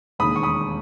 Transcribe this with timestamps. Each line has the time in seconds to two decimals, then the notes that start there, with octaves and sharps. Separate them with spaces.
0.19 E1 D#2 D#3 B5 D#6
0.36 C#6
0.43 B5 D#6